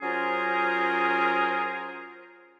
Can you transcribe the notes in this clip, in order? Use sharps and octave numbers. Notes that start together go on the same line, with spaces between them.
F#3 C#4 F4 G#4 A#4 C5